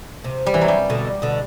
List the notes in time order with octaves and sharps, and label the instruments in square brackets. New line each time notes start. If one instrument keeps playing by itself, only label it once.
[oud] C3
[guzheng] G3
E3
F#3
G3
[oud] B2 D3
B2 D3